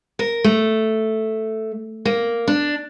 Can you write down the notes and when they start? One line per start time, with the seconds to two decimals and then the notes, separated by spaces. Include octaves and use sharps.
0.19 A#4
0.44 A3
2.05 A#3
2.48 D4